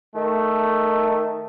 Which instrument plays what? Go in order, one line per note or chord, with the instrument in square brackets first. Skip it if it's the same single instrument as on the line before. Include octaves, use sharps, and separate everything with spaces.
[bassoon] D#3 [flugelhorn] A3